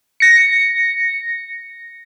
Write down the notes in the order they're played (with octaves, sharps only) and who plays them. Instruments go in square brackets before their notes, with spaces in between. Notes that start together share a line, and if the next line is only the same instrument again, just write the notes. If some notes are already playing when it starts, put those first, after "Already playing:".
[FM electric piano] A#6 C#7